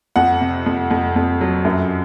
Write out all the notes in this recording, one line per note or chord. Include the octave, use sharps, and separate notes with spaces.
F2 F#5
C3
F2
F2
F2
F#3
F#2